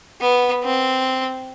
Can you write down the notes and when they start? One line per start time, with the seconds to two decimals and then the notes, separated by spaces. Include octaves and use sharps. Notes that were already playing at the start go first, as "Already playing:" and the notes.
0.21 B3
0.64 C4